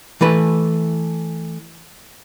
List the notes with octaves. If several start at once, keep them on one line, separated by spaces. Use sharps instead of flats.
E3 A3 B4